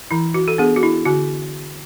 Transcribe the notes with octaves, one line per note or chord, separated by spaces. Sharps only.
E3 E4
F#4
A4
B3 D4 G#4
F#4
E4
D3 F#4